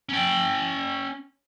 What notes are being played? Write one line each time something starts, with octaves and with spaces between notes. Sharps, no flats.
C#4 G5